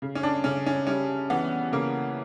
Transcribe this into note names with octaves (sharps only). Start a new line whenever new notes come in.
C#3
C#4
D4
C#3 C#4
C#4
G3 C#4
E3 B3
C#3 A#3